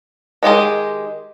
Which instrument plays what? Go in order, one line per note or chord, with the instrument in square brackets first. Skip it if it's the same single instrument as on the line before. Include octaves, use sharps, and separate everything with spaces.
[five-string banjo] D#3 G#3 G4 G#4